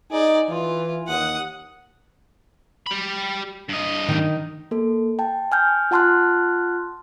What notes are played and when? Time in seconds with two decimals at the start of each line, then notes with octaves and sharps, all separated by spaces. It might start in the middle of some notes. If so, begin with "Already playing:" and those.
0.11 D#4 G#4 D5
0.49 E3 F4
1.08 D#2 F#5 D#6
2.87 G4 B5
3.69 G2 D#5
4.08 D#3 D#4
4.71 A#3 A4
5.19 G5 A5
5.52 G#5 F6 G6
5.91 F4 F#5 A5 C6 F6 F#6